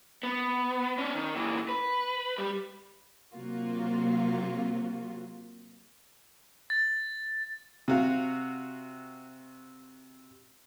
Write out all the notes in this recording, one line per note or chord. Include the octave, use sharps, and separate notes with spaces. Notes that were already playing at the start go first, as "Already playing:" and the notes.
B3
C#4 D4
D#3
A#2 E3
B4
G3
C3 F#3 A#3 F4 F#4
A6
C3 F#4 F5